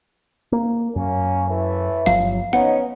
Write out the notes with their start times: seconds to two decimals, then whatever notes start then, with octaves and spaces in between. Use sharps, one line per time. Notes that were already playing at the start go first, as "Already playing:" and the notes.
0.52 A#3
0.96 F#2 A#3 C#4
1.49 A2 E3 A3
2.06 G1 F3 F#3 F5
2.53 B3 C#4 D#4 F#5